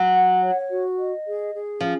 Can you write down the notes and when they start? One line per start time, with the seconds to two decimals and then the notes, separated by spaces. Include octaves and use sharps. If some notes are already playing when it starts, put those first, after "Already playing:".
Already playing: F#3
0.15 F#5
0.42 C#5
0.70 F#4
0.98 D#5
1.26 G#4
1.54 G#4
1.80 F3 C#4